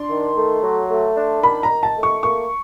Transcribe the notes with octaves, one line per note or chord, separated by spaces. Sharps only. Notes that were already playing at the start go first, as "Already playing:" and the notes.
Already playing: D4 C6
D#3
A3
F#3
A3
D4
D#3 B5
A#5
D#3
A5
A3
C#6
A#3 C#6